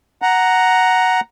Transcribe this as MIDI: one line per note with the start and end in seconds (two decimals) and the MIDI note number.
0.22 1.20 78
0.22 1.20 82